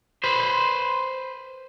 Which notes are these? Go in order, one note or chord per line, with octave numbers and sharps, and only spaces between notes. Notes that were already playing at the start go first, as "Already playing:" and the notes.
B4 C5